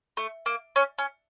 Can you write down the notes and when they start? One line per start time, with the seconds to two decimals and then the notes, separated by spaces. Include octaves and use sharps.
0.17 A3
0.46 A#3
0.76 C#4
0.99 C#4